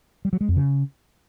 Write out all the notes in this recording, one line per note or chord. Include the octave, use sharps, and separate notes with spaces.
G3
F#3
G#3
F2
C#3